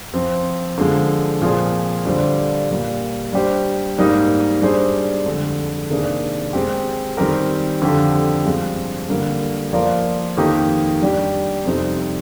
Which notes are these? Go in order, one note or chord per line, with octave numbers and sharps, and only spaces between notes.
F3 C4 F4
D3 F3 G#3
A#2 F3 C4 F4 G#4
D3 G3 D4 F4 C5
A#2 G3 A#3
G3 D4 G4 C5
G#2 G3 A#3 D#4
G3 D4 G#4 C5
F2 D3 G#3
C3 D#3 A#3 D4 G#4
G#3 C4 G4
D#3 G3 C4 G4 A#4
F2 D3 F3 C4 G4
G2 F3 G#3 C4
D3 G3 A#3
F3 A#3 F4 A#4 D5
F2 D#3 A#3 D#4 G4
G3 D4 G4
F2 C3 G3 C4 D#4